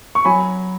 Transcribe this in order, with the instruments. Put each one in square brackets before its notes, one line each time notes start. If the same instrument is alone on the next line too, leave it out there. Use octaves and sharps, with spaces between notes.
[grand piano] C#6
F#3 G#5 B5